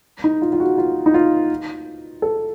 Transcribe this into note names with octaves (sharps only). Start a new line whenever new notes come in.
D#4
F4
F4
F#4
F4
D#4
F4
A4